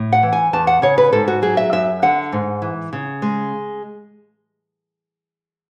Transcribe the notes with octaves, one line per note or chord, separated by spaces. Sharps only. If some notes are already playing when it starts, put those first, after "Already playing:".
Already playing: A2
F#5
E3
G#5
E2 A5
F#5
C#3 C#5
B4
G#2 A4
F#4
F#3 G#4
E5
F#2 E5
D3 F#5
G#2
E3
C#3
G#3